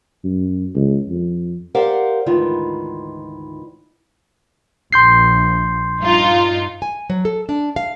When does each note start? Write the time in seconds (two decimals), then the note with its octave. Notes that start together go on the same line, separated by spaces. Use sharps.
0.24 F#2
0.75 C#2
1.08 F2
1.75 G4 A#4 C5 D5 F5 F#5
2.26 D2 G#2 D#3 E3 F4
4.93 A#1 C6 G6 C7
6.01 G2 D#4 F4
6.82 G#5
7.10 F#3
7.25 A4
7.49 D4
7.76 F5